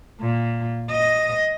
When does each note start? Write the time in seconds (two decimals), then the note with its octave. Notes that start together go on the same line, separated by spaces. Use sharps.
0.21 A#2
0.91 D#5